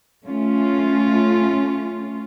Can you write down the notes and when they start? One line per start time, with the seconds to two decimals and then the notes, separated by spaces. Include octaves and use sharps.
0.24 A3 C#4 F4